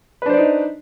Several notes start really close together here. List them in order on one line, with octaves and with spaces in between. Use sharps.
B4 D4 C5 D5 D#4